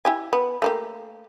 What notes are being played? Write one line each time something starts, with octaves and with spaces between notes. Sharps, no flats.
E4 G4 G#5
B3
A3 A#3 G4